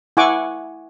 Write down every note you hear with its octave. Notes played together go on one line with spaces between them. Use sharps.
E4 F#5 G#5 C#6 D6